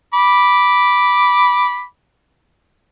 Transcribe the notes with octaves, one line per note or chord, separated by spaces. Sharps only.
B5 D6